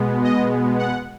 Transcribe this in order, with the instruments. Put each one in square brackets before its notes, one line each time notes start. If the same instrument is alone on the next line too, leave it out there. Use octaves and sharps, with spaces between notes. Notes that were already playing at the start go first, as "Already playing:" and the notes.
Already playing: [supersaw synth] B2 G#3 B3
D#5
F#5